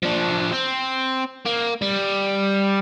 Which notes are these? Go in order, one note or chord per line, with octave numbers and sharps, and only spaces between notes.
F3 D4
C4
A#3
G3